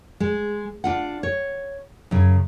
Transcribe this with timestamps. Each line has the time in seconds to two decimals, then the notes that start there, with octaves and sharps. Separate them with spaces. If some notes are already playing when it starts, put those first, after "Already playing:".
0.20 G#3
0.84 D4 F4 F#5
1.23 C#5
2.11 F#2 C#3